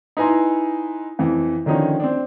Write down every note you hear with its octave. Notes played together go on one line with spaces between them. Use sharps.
D#4 E4 B4 G#5 A#5 C6
F2 E3
D3 D#3 F3 C#4 D#4
C4 D4